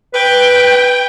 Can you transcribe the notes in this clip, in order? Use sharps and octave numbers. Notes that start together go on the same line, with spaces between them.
B4 G5